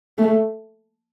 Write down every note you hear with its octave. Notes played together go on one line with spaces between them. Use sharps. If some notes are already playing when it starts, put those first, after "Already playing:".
A3